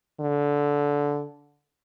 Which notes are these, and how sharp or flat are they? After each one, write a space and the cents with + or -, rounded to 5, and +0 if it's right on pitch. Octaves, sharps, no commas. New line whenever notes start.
D3 -15